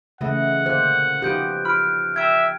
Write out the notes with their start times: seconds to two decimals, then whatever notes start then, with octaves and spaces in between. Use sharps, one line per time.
0.21 C#3 E3 A3 D#5 F#5
0.66 A#2 D3 C5 F#6
1.22 B2 F3 D#4 G4 F#6 G6 D7
1.65 F4 B5 F6 D7
2.16 E5 G5 A#5 G6 G#6 D7